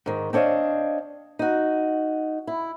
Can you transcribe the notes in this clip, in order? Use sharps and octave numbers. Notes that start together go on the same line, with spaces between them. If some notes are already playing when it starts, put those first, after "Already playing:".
G#2 D#3
C4 D4 C#5 D#5 F5
D#4 F#4
E4